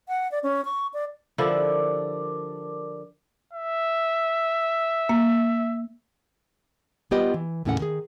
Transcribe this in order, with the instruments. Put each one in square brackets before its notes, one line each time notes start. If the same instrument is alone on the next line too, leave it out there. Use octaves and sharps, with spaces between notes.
[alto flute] F#5
D5
C#4
C#6
D5
[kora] D3 F3 E4 [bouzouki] G3 B3 D4 [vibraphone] A#4 D6
[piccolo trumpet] E5
[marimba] A#3
[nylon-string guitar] G3 B3 F4 G4 B4 D#5
E3
D#2 A2 C#3 C#4 A4 F#5
D#3 G#4